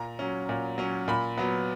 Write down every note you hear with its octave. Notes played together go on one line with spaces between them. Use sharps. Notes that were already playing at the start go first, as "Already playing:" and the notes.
Already playing: A#2 A#5
F#3 C#4
A#2
F#3 C#4
A#2 B5
F#3 B3